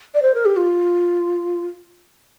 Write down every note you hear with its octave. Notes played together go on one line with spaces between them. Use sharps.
D5
C5
A#4
G4
F4